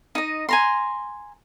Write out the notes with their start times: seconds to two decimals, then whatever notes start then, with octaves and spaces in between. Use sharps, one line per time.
0.15 D#4 D#5
0.49 G#5 A#5 C6